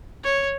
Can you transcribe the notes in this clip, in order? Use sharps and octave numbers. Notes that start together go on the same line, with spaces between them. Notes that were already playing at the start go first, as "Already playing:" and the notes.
C#5